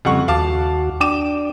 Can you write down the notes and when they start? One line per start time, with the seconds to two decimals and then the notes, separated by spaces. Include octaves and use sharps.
0.05 F2 C#3 G3 F#5 C#6
0.28 D#2 F#4 F5 A5 D6
1.00 D4 G5 D6 E7